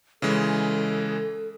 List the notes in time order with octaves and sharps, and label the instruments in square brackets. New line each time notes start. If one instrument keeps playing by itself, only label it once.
[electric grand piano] C#3 E3 G#3 [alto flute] A4